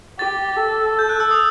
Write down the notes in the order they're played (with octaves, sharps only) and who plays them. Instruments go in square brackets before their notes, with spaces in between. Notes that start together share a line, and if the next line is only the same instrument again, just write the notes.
[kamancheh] G4 [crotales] A6
[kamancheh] A4
[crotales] G6
F#6
E6
D#6